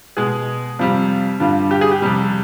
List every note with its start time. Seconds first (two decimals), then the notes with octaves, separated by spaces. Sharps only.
0.17 B2 G#3 G#4
0.79 F2 C3 G3 F4
1.40 G2 D3 G3 F4
1.71 G4
1.81 G#4
1.91 G4
2.02 F2 C3 G3